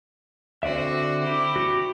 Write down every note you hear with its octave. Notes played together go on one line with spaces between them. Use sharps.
D3 C4 F#4 D5 E5
E4 G4
F#4